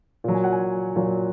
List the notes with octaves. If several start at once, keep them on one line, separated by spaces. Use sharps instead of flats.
A#2 F#3
G#5
F#5
G#5
A#2 F#3